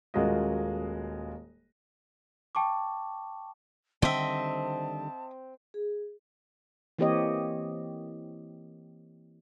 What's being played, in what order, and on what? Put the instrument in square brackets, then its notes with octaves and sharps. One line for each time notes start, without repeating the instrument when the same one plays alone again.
[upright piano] D#1 G#3 A#3 F4 F#4 D#5
[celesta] G5 A5 C#6 D6
[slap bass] D3 D#3 G3 [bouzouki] C4 [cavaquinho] D#5 E5 [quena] A5
[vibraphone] G#4
[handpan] E3 A#3 C4 G4 C#5 D#5